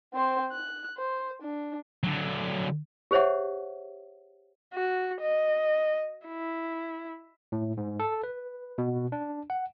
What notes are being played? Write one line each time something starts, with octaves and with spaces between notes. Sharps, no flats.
C4 C5
F#6
C5
D4
D3 F#3
G4 G#4 C5 C#5 E5 F#5
F#4
D#5
E4
A2
G#2
A4
B4
B2
D4
F#5